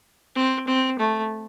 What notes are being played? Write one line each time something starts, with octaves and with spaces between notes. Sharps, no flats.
C4
C4
A3